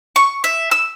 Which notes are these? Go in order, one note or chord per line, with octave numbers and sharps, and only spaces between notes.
C#6
E5
E6